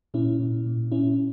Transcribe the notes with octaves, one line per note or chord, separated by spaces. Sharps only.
A#2 C#4 E4
A#2
A#2
A#2 C#4 E4